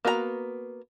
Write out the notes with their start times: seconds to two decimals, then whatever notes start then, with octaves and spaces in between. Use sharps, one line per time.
0.05 A#3 B3 F#4 G#4 A#5